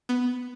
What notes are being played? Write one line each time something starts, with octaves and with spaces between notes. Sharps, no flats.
B3